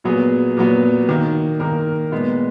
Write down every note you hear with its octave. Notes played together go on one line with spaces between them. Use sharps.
A#2 F#3 B3 G#4
A#2 F#3 B3
D#3 A#3
D#3 A#3 A#4
A#2 G#3 B3